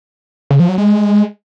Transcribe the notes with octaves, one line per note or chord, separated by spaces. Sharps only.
C#3
F3
F#3
G#3